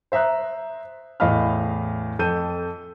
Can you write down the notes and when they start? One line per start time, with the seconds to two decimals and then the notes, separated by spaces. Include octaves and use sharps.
0.12 C5 E5 A#5 D#6 F#6
1.20 E2 A2 D#5 F5 B5 F6
2.19 F2 A4 G6 D#7